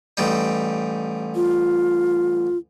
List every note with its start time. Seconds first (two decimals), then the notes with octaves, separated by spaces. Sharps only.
0.17 A1 G3 D#4
1.35 F4